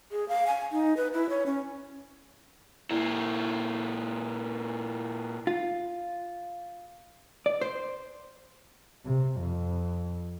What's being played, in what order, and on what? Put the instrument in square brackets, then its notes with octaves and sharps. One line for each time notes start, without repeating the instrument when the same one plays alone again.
[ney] G#4
F5
G#5
D#4
B4
E4
C#5
C#4
[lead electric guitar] A#2 E4
[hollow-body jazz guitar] F4
D5
C5
[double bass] C3
F2